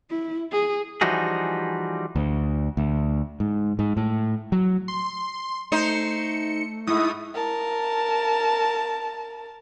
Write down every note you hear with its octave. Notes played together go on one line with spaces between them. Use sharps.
E4
G#4
E3 F3 G3 D#4 F#4 G#4
D2
D2
G#2
G#2
A2
F#3
C6
A3 D#4 C5 C#7
G#2 E4 D#6
A#4 A5